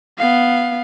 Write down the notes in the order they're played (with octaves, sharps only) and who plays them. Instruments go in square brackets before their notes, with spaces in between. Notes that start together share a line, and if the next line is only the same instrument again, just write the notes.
[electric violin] B3 F5